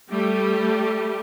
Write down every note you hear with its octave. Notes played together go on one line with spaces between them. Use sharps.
G3 A3 G4